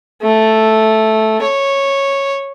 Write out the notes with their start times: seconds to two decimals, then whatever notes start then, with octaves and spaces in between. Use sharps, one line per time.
0.22 A3
1.42 C#5